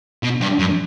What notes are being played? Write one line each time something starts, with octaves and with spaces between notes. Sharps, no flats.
B2
G2
F#2